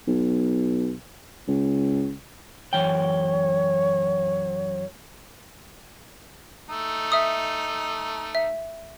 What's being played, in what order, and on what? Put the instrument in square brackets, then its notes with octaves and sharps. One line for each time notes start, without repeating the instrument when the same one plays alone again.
[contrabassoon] B1
C#2
[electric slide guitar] F#2 E3 G5 [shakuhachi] C#5
[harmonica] A3 D#4
[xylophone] E5 D#6
E5